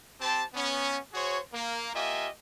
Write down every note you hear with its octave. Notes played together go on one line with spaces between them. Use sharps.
C4 G4 C5 A5
B3 C#4
F#4 G#4 C5 C#5
A#3
A#3 F4 G4 D#5 E5 G#5